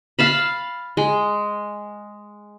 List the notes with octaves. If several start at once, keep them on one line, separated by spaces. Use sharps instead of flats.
F5 A5 B5
G#3